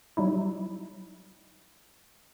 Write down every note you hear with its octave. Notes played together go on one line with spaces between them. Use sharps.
F#3 G3 D#4 E4